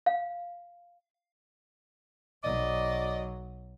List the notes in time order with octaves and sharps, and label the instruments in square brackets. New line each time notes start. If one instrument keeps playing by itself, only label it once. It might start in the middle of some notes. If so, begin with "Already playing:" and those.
[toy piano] F5
[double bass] B1 F#3 [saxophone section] D5 D#5